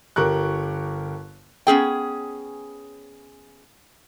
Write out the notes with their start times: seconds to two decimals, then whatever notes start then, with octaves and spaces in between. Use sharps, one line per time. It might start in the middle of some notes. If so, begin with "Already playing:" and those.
0.16 G1 G4 A#4 C#6 F#6
1.67 B3 C#4 G#4 G5